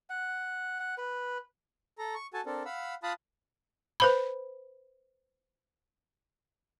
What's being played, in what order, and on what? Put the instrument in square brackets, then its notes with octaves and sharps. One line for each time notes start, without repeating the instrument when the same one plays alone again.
[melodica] F#5
F#5
B4
[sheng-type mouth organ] A4 A#5
C#6
F#4 A4 G#5 A5
C4 D4 A4 A#4
F5 F#5 B5 E6
F4 F5 A5 B5 D#6 F#6
[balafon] B4 C5 B5